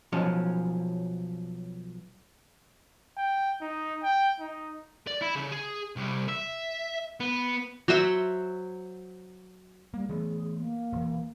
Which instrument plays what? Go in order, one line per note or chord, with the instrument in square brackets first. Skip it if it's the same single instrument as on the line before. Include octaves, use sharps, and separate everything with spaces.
[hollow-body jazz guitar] B1 F3 F#3 C#4
[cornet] G5
D#4
G5
D#4
[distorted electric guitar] D5
E4
C#3
G#4
C2
E5
B3
[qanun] F#3 C5 E5 F#5
[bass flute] G3 [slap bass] A#3
[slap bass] E3 A3 B3 [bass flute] G#4
[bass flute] A#3
[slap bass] E1 E3